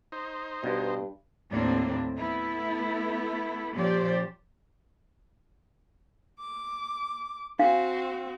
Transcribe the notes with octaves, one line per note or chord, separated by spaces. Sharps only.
D#4 C5
G2 B2
D#2 A2 A#3 C4 D4
A3 B3 E4
A#2 F3 C#4 G4 C5 D5
D6
C4 D4 F#4 F5